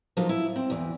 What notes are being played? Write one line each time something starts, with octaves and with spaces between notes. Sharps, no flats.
F3 F#3 A#3 D#4 F4
E4 E5
C4
E2 E3